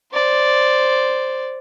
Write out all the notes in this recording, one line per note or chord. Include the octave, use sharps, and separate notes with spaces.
C5 D5